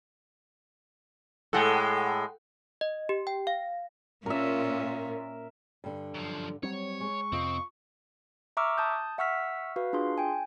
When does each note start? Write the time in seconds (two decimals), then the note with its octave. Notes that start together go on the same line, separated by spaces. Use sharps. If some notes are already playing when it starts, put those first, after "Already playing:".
1.53 A2 G#3 A4 F#5 G5
2.81 D#5
3.09 G4
3.27 G5
3.47 F5
4.26 A#2 C#4 A#4 E5
5.84 G2 D3
6.14 F#2 F3
6.63 F#3 G3 C4 C#5
7.01 G#3 C#6
7.32 F2 C3 C4 F4 D#5
8.57 E5 A#5 C#6 D6 E6 F6
8.78 A5 D#6 G6
9.18 E5 F#5 C#6 E6 F6 B6
9.76 F#4 B4 F5
9.93 D4 F4 G#4 C6
10.18 G5 G#5